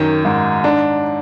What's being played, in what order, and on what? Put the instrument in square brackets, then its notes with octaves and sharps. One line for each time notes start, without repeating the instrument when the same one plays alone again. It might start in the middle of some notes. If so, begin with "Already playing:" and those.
Already playing: [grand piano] F#2 D#3
G#2
D4